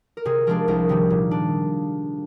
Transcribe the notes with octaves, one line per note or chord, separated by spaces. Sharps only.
A#4
C3 G#4
F3 G#3 D4 A#4
C2 A#4
C3 D#3 G3
A#2
D4